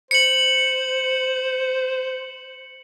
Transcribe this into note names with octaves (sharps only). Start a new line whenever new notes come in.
C5 C#7 F#7